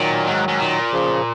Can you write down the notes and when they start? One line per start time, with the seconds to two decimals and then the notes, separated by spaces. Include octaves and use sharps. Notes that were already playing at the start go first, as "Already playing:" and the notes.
Already playing: A#2 D#3 F#3
0.27 G#2
0.48 G#2
0.60 A#2
0.92 C#3 F3